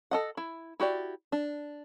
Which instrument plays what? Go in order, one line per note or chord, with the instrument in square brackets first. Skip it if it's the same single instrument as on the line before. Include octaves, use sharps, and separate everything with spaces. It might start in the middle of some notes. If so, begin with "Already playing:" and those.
[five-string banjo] A4 D#5 F#5
E4
E4 F#4 G4 D5
D4